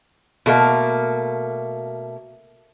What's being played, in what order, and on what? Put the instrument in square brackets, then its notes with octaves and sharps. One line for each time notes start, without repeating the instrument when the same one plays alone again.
[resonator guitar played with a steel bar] B2 A3 A#3